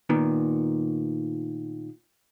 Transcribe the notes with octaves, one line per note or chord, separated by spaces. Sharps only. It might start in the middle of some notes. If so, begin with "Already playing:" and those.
A#2 D#3 B3